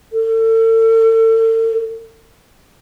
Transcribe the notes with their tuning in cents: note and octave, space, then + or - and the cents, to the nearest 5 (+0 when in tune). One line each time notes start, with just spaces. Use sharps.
A4 +40